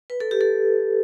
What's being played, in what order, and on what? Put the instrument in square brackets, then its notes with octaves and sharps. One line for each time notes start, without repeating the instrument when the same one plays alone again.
[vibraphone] B4
A4
G4
A4